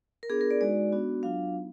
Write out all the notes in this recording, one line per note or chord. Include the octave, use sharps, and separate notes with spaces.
A#4
B3 D4 F4 G#4
A#4
D5
G#3 D#4 F#4 D5
B3 D4 F#4
F#3 D4 F4 F5
B3 D#4